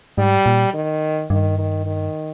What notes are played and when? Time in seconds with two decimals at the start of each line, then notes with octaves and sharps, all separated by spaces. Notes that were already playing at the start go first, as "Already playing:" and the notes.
0.18 G#2 G3
0.46 A#2
0.74 D#3
1.30 G2 D#3
1.58 D#3
1.86 D#3